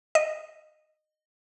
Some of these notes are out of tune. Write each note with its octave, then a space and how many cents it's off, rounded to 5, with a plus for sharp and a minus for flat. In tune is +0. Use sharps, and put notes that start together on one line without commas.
D#5 -15